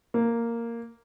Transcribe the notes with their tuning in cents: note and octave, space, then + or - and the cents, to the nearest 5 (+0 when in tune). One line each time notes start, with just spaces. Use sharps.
A#3 -5